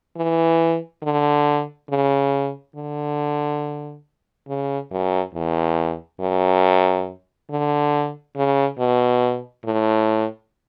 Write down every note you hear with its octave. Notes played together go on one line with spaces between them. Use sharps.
E3
D3
C#3
D3
C#3
F#2
E2
F#2
D3
C#3
B2
A2